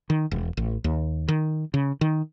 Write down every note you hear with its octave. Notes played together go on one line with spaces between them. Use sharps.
D#3
E1
A1
D#2
D#3
C#3
D#3